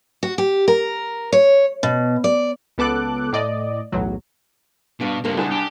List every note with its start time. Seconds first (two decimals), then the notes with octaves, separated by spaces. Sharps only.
0.23 F#4
0.38 G4
0.68 A#4
1.32 C#5
1.83 B2
2.24 D5
2.78 C#2 B3 A4 D6 F#6
3.33 A2 D5 D#5
3.92 B1 E2 A2 F#3
5.00 G2 B2 D4 F5
5.24 C#2 G2 C3 A#3 D4
5.37 C2 D4 G#4 D#5 F#5 A5
5.51 D4 G4